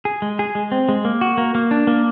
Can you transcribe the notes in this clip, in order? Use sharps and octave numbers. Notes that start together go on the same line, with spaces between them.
G#4
G#3
G#4
G#3
C4
G#3
A#3
F#4
A#3
A#3
D4
A#3